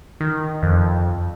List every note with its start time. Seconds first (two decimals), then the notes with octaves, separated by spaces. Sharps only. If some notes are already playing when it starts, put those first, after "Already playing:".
0.21 D#3
0.63 F2